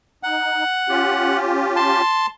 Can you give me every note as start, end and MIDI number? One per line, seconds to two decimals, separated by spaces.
0.23 0.64 63
0.23 1.37 78
0.89 2.02 61
0.89 2.02 65
0.89 2.02 67
1.76 2.26 81
1.76 2.26 84